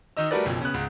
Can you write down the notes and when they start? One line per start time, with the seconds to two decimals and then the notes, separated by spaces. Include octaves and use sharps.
0.17 D#3 D#4 D#5 E6
0.31 G3 A3 F#4 A#4 B4 D5
0.45 F#1 B1 F3
0.61 C#3 B3 F#6
0.74 C#2 G#2